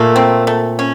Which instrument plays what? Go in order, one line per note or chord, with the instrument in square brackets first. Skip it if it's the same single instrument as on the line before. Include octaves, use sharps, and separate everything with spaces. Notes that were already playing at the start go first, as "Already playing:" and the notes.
Already playing: [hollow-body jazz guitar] A#2 A#3 [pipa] A3
[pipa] C4
A3
C#4